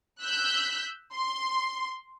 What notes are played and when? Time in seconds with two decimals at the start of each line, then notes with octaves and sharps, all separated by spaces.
0.22 E6 F#6 G6 B6
1.14 C6